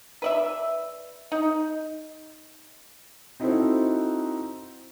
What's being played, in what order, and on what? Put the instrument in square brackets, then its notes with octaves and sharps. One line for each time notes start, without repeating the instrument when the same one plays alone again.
[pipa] B4 D5 E5
D#4
[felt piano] C4 D#4 E4 F#4 A4 C5